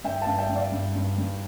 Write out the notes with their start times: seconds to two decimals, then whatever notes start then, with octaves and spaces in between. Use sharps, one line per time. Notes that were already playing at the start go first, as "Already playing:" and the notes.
0.04 G2 E5 G5
0.21 F5 A5
0.27 G2
0.38 E5 G5
0.49 G2
0.55 D5 F5
0.72 G2
0.95 G2
1.18 G2